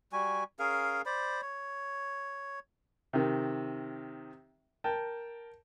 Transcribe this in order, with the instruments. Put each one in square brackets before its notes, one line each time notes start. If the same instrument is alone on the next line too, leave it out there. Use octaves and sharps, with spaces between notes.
[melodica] G3 F#4 G#5
C#4 G#4 A#4 F5
C5 D5 B5
C#5
[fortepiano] C3 D#3
A#4 G5 A5